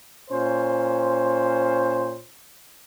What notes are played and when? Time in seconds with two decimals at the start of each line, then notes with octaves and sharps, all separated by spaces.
0.30 A#2 C#4 C5